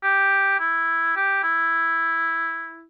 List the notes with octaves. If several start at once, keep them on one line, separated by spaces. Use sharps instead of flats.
G4
E4
G4
E4